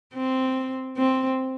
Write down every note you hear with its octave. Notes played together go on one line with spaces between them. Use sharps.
C4
C4